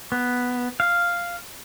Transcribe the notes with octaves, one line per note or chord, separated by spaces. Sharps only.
B3
F5